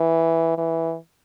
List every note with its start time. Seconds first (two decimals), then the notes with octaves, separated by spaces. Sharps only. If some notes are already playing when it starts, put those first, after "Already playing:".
Already playing: E3
0.58 E3